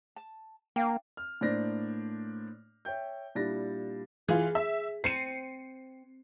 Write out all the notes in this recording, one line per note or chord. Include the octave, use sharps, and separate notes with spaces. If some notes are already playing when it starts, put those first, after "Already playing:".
A5
A#3 D4 F5 G5
F6
A2 A#3 D4 C5 D5 A#6
C#5 E5 G5 G6
A#2 G3 D4 E4 A6 A#6
E3 F4 G#4
E5
C4 C7 C#7 D#7